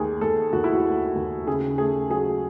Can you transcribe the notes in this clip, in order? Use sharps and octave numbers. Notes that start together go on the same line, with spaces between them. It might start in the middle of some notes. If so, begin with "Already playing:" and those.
Already playing: D#2 A3 G#4
D#2 A4
D#2 F#4
E4
F#4
A3
D#2
C#3 G#4
A3 G#4
F#3 G#4